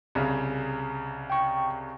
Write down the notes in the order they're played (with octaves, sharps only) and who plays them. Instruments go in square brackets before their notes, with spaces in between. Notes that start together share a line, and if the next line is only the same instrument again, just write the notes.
[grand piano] C2 C#3
[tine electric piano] G5 C#6